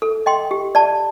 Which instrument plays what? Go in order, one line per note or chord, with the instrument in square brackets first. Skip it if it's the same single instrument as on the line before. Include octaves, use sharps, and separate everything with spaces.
[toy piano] A4
D#5 G5 C6
G4
D5 A5